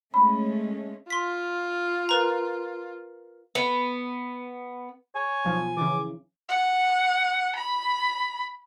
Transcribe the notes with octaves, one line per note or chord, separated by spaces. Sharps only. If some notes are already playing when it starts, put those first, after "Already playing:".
G#3 A3 C#4 B5
F4 C6 B6
A#4 B4 A#5
B3
C#5 G#5
B1 F3
C#3 E3 D6
F#5
B5